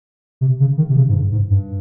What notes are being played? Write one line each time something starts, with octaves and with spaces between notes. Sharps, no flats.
C3
C#3
D#3
C3
C#3
G#2
G2
G#2
G2